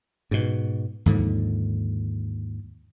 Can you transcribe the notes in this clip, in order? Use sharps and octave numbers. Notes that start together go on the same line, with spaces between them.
G#2 B2
D#2 G#2 D3 F3